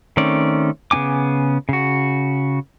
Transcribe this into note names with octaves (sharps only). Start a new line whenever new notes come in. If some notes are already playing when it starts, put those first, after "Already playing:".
D#3 A3 C4 C#4 D5
C#3 B3 C#4 G#5 D6
C#3 F#4